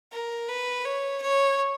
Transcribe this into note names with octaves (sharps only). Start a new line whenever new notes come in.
A#4
B4
C#5
C#5